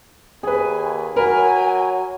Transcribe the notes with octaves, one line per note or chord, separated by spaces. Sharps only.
D#2 G#4 B4 G#5
F#3 A#4 G#5 B5